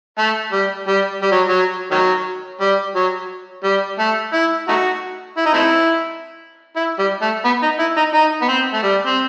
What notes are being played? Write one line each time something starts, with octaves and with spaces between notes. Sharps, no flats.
A3
G3
G3
G3
F#3
F#3
D#3 F#3
G3
F#3
G3
A3
E4
A3 D#4 F#4
E4
D#4
A3 C4 E4
E4
G3
A3
B3
D#4
E4
D#4
D#4
B3
C4
A3
G3
C4